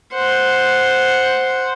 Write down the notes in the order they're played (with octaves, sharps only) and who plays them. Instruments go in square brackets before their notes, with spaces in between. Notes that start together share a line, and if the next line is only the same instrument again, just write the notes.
[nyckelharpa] C5 F#5